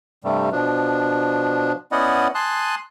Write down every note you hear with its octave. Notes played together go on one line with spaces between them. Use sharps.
G2 C3 G3 A3
B2 F3 D4
B3 C#4 E4 D5 D#5 F#5
G#5 A5 C6 D#6 F#6